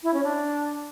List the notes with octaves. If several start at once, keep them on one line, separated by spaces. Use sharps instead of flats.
E4
C#4
D4